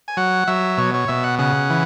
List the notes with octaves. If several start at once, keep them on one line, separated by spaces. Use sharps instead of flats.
G#5
F#3 F#5
F#3 E5
B2 C#5
C#5
B2 E5
F#5
C#3 F#5
E3